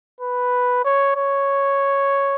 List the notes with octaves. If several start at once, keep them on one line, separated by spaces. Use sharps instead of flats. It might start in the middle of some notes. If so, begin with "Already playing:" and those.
B4
C#5
C#5